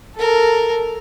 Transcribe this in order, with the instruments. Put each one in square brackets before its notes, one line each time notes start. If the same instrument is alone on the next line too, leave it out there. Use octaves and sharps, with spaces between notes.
[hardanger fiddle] A4 A#4